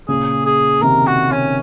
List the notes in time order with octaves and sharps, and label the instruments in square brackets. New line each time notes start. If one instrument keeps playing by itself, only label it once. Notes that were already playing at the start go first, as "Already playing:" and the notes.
[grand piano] A#2 C#3 [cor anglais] G#4
[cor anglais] G#4
[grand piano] C3 D#3 [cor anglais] A#4
[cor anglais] F#4
C#4